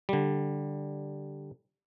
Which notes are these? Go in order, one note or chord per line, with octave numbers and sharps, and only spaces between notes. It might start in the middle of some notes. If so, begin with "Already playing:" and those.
D3 G3